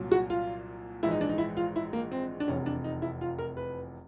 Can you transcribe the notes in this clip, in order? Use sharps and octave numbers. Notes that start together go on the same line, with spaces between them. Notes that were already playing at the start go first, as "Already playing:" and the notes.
Already playing: C2 A#2 F#3
F#4
F4
A#1 G#2 E3 E4
D#4
D4
D#4
E4
F4
E4
A#3
C4
D4
F1 E2 C3 C#4
D4
D#4
E4
F4
A#4
B4